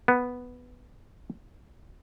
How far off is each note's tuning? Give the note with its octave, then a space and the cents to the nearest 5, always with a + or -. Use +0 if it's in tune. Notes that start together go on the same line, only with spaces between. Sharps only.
B3 +0